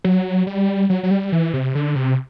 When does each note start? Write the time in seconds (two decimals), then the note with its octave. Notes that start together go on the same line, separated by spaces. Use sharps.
0.04 F#3
0.47 G3
0.90 F#3
1.03 F#3
1.11 G3
1.32 E3
1.54 C3
1.75 D3
1.96 C3